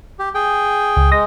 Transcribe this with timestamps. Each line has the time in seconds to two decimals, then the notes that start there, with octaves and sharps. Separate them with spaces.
0.19 G4
0.35 G#4 G5
0.97 C#2
1.11 G#3 D#6 A#6